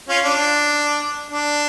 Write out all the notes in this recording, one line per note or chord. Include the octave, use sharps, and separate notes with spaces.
C#4 F4
D4
D4